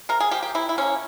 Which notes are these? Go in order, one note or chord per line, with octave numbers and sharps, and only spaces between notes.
C3 A#4
G#4
F3 A#3 G4
G4
C3 E4
E4
F3 A#3 C#4